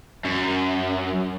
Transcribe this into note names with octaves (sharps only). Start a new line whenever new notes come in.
F#2